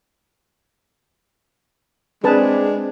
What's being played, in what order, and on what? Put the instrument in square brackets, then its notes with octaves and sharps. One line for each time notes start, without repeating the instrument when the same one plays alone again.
[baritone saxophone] G#3 [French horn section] C4 D4 [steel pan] G#4 B4 A5